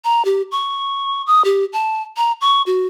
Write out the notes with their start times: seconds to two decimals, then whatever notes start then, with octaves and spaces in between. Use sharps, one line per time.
0.05 A#5
0.25 G4
0.52 C#6
1.27 D#6
1.45 G4
1.73 A5
2.17 A#5
2.41 C#6
2.66 F#4